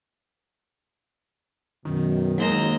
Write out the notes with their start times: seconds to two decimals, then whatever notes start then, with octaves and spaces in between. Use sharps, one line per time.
1.85 F#2 B2 D#3
2.38 D#2 F#3 G#3 D#4 C5 A#5